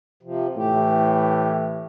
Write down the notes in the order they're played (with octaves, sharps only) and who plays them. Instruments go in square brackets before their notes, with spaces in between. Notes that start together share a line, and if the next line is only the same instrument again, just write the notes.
[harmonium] C3 F3
[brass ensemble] A2 E3 [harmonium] G4